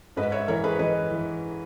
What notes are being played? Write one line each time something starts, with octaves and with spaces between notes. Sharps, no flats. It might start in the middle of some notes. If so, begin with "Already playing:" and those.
G#2 B4 D#5
C#5 E5
E3 A#4 C#5
G#4 B4
E3 B4 D#5
E3